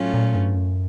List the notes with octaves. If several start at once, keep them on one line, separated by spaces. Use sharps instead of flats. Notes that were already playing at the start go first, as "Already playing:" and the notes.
Already playing: A2 F#3 A3 C#4 F4
A#2
G2
F#2